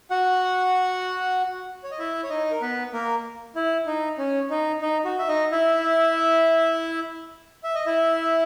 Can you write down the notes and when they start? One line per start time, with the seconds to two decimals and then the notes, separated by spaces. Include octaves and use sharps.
0.10 F#4 F#5
1.84 C#5
1.91 D#5
1.99 E4 E5
2.23 C#5
2.30 D#4 D#5
2.51 A#4
2.61 B3 B4
2.93 A#3 A#4
3.56 E4
3.87 D#4
4.18 C#4
4.50 D#4
4.81 D#4
5.05 F#4
5.19 E5
5.28 D#4 D#5
5.51 E4 E5
7.63 E5
7.75 D#5
7.86 E4 E5